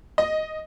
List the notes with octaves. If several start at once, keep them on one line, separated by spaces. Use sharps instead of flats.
D#5